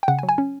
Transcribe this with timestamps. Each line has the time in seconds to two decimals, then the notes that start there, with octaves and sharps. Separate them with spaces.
0.03 G5
0.08 C#3 F#5
0.19 G#5
0.23 F#3
0.29 G#5
0.38 C#4